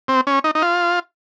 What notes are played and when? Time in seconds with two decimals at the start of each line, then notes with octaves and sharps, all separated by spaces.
0.08 C4
0.27 C#4
0.44 D#4
0.55 D#4
0.62 F4